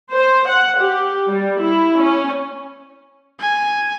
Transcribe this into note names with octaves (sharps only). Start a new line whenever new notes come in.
C5
F#5
G4
G3
E4
C#4
G#5